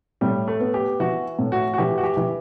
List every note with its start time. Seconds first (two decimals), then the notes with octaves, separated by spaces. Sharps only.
0.21 A2 G3
0.48 A3
0.60 B3
0.74 G4
1.00 E3 F#4
1.39 A2
1.52 F#4
1.74 F#4
1.78 E3 G4
1.98 F#4
2.04 G4
2.17 E3